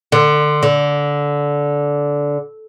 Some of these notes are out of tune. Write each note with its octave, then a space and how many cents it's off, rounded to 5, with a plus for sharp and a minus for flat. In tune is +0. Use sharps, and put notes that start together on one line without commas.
D3 +25
D3 -15